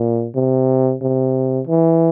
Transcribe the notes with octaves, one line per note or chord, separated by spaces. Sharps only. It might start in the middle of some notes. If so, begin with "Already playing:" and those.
Already playing: A#2
C3
C3
E3